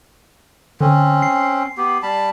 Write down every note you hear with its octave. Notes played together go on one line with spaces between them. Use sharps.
D3 C4 C#4
C7
B3 G4
G3 A5 B5